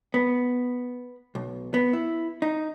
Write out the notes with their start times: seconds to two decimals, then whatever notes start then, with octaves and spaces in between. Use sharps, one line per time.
0.14 B3
1.35 B1
1.74 B3
1.93 E4
2.42 D#4